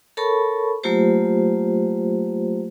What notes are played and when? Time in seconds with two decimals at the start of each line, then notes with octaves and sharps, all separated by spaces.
0.17 A4 A#4 C#5 A5 B5 C#6
0.83 F#3 A3 A#3 F4 G4 C5